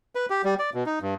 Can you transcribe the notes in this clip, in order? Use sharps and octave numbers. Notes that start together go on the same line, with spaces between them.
B4
G4
G3
D5
B2
D#4
G2